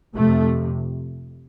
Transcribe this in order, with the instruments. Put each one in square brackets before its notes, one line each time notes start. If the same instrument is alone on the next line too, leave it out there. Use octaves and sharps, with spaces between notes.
[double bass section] F2 C3 A3